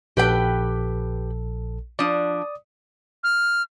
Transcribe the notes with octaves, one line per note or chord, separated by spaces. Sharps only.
A#1 G4 A4 B4 G5
F3 D4 D5 D#6
F6